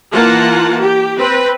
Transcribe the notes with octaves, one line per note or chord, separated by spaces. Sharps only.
E3 A#3 F4 A#4 F#5 A5
G4
C4 B4